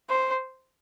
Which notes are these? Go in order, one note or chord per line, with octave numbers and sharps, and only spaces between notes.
C5